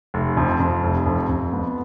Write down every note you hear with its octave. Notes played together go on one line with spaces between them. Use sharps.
F1
F2
F2
F1
F2
F2
B3